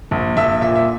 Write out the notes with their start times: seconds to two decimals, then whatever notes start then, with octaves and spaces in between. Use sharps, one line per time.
0.11 A#1
0.37 A#1 E5
0.61 A#2 E5
0.76 E5